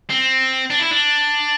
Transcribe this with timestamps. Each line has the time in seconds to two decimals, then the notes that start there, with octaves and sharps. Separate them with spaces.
0.10 C4
0.70 D4
0.80 E4
0.91 D4